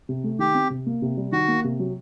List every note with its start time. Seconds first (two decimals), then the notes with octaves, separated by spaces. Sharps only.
0.09 C3
0.24 A3
0.39 D#3 G4
0.55 C4
0.70 C3
0.86 A#3
1.02 C3
1.17 G3
1.32 D#3 F#4
1.48 A#3
1.64 C3
1.79 F#3